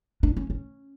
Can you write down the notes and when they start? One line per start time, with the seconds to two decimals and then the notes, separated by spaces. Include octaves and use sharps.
0.23 D4
0.37 C#4
0.50 C#4